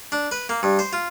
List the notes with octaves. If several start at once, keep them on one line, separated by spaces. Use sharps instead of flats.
D4
B4
A#3
G2
C5
F4